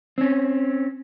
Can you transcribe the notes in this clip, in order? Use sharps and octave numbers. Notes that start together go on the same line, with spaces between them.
C4 C#4